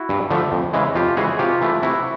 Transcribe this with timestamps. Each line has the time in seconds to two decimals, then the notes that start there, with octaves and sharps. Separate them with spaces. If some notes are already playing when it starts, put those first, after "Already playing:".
Already playing: E4 F#4
0.09 G2
0.30 D3 F3 A3
0.52 F2
0.73 C#3 E3 G#3
0.95 F2 F4 G4
1.17 C#3 E3 G#3 F#4 G#4
1.39 C3 F4 G4
1.62 E3 A3
1.82 C3 E4 F#4